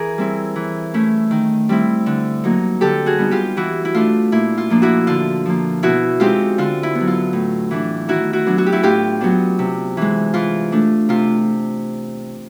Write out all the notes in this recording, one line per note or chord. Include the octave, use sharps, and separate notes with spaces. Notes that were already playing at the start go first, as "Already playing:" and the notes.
Already playing: E3 G#4 A#4
G3 C4 E4
E3
A3 C#4 E4
D#3
G3 C4 E4
D3
F#3 A#3 D#4
D3 G4 A4
F#4 G#4
G3 B3 D#4
F4 G4
E3 E4 F#4
E4
A3 D4 F4
A#2 E4
F4
F3 A#3 D4
E4 F#4
D3 F4
F3 A#3
B2 E4 F#4
G#3 C4 D#4 F4 G4
D3 F4
E4
B3
F#3
F4
A2
E3 A3 D4
D#3 E4 F#4
E4 F#4
F#3 B3 D4
F#4
G4
E4 F#4
A2 F4 G4
F#3 B3 D4
C3
E3 G#3
E3 F4
A3 D4
C3 F4